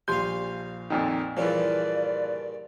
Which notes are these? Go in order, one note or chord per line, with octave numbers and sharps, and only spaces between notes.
A#1 G3 F5 G#5 C6 G6
F2 A#2 D#3
G2 A#2 C#3 E3 F3 D5